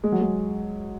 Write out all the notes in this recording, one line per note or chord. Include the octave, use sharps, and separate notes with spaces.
G#3
F#3
G#3